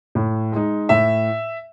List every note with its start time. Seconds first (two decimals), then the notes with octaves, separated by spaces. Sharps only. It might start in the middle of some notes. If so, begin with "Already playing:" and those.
0.15 A2
0.52 G#3 D#4
0.89 A2 E5